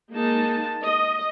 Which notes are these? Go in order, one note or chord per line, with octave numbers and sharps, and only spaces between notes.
G#3 A#3 D#4 A5
D#5